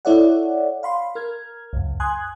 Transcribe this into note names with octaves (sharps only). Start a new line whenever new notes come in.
E4 A4 C#5 D5 E5 F#5
F5 B5 C6
A#4 F6 G#6
C#2 F#2
G#5 C6 D#6 F#6 G#6